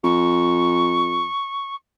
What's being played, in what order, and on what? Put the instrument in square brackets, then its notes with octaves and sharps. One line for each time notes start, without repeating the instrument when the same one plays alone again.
[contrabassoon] F2 [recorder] C#6